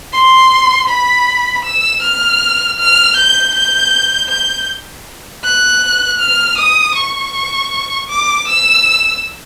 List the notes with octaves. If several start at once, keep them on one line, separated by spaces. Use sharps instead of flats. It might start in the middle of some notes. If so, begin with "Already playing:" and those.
C6
B5
E6
F6
F6
G6
G6
G6
F#6
F6
D#6
C#6
D6
E6